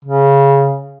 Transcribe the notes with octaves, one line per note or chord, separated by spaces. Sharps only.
C#3